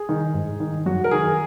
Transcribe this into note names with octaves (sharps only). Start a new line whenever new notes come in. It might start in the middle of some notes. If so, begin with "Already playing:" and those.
Already playing: G#4
D#3
G#2
D#3
F#2 F#4
A#4
D#3 G#4